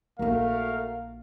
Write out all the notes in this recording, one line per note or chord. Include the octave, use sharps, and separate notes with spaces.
A#1 A3 D#4 F#4 A#4 F5